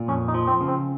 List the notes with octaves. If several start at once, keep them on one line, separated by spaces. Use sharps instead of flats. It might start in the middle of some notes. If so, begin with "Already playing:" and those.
Already playing: A#2
F2 C#4
D#4
F3
C4
C#3
C4